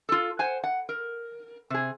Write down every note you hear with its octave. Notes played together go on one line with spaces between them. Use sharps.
F4 A4
C5 F#5 G#5
F#5
A#4
C3 G#4